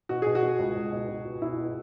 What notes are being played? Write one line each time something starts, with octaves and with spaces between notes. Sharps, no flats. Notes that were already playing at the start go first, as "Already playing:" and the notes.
B2 F#4
B2 G#4
F#4
B2
C#2
C#2
B2
B2
B2
B2 E4
B2